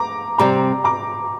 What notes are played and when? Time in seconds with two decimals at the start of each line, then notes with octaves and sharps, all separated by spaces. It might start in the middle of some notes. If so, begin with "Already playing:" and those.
Already playing: A#5 D6
0.38 C3 G3 C4 A#5 D6
0.84 A#5 D6